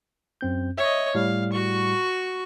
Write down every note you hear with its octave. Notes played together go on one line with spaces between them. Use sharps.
F#2 C4 G6
C#5 D#5 E5
A2 G3 F5
F#4 C#6